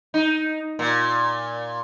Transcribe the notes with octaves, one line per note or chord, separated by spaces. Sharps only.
D#4
A#2